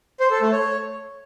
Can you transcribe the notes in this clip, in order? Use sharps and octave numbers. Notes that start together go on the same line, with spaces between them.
C5
A4
A3
C#5